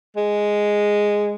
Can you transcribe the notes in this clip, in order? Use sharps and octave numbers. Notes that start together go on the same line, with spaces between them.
G#3